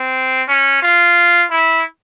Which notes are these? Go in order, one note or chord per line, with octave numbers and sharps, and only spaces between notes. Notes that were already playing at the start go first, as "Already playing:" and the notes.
Already playing: C4
C#4
F4
E4